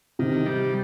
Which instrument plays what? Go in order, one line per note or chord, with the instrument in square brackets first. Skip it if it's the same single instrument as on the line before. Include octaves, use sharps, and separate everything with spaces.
[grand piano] C3 [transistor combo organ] D#3
[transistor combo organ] G3